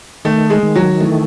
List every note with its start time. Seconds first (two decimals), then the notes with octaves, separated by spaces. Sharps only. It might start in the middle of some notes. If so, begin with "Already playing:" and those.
0.25 D#3 A3
0.50 G#3
0.63 D#3
0.75 F#3
1.01 E3 A3